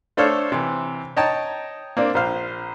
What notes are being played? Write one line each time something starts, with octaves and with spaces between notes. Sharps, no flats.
A3 D4 A4 C5 C#5 F5
C3 E3
C#5 D#5 G5 A5 A#5
A#3 C4 D4
A#1 C5 F5